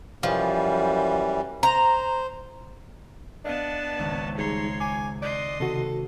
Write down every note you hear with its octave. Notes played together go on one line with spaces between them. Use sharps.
F#2 E3 F3 G3
C5 A#5
B3 D4 D#5 F5 A5
G#1 C#2 C#5
G3 D#4 G#4 C#5 A#5 C6 C#7
G#5 D6
D5 D#5 C6 F#6 D7
C3 D#3 F#4 A4